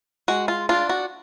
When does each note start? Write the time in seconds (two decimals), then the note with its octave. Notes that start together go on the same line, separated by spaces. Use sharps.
0.28 G#3 F#4
0.48 F4
0.69 D4 F4
0.89 F#4